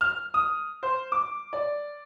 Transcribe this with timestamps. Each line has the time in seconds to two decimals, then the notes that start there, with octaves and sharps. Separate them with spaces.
0.01 F6
0.34 D#6
0.83 C5
1.12 D6
1.53 D5